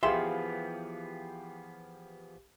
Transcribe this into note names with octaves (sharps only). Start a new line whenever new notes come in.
E3 F3 B3 G4 G#4 E5 F5 C6